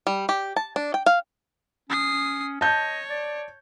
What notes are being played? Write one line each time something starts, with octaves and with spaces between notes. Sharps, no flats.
G3
G4
A5
D4
G5
F5
C#4 D#6 C7
C#5 D#5 A5 G6
D5